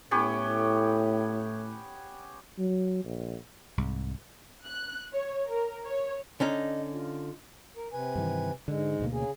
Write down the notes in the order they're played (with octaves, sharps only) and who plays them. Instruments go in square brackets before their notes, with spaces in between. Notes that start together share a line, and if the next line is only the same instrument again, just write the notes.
[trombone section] A2 [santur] B3 C#4 G4
[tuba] F#3
A#1
[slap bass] C2 G#2
[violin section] F#6
C#5
A#4
C#5
[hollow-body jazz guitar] D3 C#4 D#4 [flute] D#5
[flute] F4
[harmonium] A#4
C3 B4 G#5
[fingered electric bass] G2 D#3 E3
[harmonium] G#2 G#3 [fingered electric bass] D3
[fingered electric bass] D2 B2 A#3
[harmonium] C#3 G#4